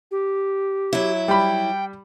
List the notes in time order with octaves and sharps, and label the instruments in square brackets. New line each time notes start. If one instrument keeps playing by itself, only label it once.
[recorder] G4
[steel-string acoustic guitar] F#3 E4
[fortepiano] G3 B5 [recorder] G5